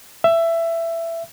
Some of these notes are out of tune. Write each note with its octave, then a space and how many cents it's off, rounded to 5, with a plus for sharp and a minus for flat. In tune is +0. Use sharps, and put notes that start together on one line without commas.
E5 +15